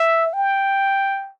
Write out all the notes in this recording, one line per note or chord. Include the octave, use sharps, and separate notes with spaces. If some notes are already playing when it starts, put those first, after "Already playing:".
Already playing: E5
G5